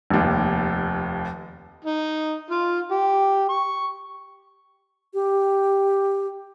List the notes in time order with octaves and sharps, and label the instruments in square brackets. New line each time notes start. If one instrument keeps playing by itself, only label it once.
[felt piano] F1 D#2
[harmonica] D#4
F4
G4
C#6
[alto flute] G4